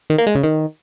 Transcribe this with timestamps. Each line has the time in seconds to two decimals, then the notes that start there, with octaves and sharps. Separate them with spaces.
0.10 D#3
0.18 A#3
0.27 G#3
0.35 C#3
0.43 D#3